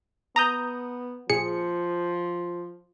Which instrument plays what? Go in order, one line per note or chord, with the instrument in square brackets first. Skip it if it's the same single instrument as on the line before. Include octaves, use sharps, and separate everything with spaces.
[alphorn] B3 [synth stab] A#5 D#6 G6
[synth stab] A#2 G#4 C#7 [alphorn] F3